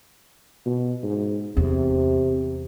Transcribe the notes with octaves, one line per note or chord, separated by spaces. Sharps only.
B2
G#2
E2 C3